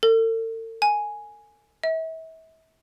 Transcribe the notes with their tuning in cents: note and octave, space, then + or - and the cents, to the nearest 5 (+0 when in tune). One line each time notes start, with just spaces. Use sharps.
A4 +45
G#5 +5
E5 -35